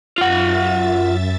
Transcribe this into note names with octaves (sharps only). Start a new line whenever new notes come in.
F#2 F4 E5 F#5 A6